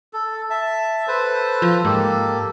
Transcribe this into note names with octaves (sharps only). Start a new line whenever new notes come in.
A4
E5 A5
A4 B4 C5
F3
G#2 A#3 G4 A4